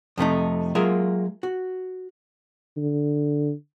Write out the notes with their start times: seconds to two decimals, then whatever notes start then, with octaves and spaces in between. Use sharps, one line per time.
0.18 F2 C3 A3 D#4
0.75 F#3 G#3 A#3 F4 A#4 E5
1.43 F#4
2.77 D3